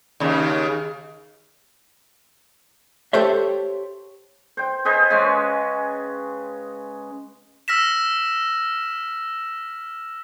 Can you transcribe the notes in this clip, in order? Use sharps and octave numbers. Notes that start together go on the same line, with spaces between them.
D#2 C#3
G4 A4 C5 C#5 E5
C5 G5
G#4 B4 C5 D#5
C#3 G#3 C#4 G#5
E6 F6 A#6 B6 E7